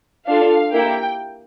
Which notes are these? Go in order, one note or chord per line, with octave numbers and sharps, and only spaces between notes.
D4 F4 A4 F5
A#3 E4 G4 G5